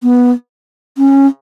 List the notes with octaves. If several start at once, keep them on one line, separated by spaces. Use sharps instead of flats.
B3
C#4